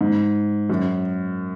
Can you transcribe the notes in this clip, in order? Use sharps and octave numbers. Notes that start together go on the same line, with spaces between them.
G#2
F#2